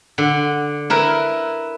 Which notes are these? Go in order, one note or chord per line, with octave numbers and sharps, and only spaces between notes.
D3
E4 A#4 B4